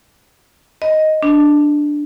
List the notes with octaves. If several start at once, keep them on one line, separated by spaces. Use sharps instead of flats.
D#5
D4